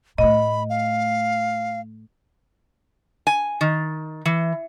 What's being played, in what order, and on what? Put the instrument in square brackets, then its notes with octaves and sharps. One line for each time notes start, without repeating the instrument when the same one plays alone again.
[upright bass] A2 A3 [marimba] D#5 [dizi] B5
[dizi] F5
[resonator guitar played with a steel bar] G#5
D#3
E3